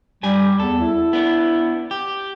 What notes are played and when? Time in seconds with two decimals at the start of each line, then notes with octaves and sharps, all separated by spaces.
0.23 G2 G3 G4 G#5
0.60 E2 A4
0.80 E4
1.13 B3 D4
1.91 G4